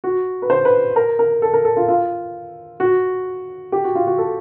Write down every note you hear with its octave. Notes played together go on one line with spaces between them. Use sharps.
F#4
B4
C5
B4
A#4
A#4
A4
A#4
A4
F4
F4
F#4
G4
F#4
F4
F#4
A4